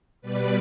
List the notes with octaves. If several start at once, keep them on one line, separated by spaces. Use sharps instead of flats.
B2 G3 B4 D5